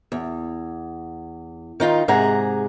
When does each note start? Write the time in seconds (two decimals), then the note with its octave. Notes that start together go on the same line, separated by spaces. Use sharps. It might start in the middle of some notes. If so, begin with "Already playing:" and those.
0.12 E2
1.80 D#3 D#4 F4
2.08 G#2 C3 G#4 F#5 A#5